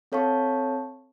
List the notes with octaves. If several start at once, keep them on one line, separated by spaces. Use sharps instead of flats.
C4 A4 C#5 F5 A5 C#6